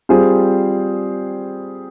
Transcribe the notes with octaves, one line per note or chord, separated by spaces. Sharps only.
G3 C4 F4 G#4 C5